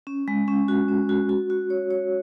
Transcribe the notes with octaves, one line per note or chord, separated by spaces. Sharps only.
C#4
G#3
C#4
F#4
C#4
F#4
F#4
F#4
C#5
C#5